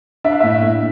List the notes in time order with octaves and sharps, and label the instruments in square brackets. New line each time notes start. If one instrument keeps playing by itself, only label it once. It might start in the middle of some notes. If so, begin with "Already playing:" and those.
[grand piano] D4 [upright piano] E5
[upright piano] F5
[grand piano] A2 [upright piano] E5
[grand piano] A2